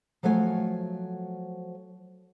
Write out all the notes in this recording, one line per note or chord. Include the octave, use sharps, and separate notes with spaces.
F3 F#3 A3 D5 G#5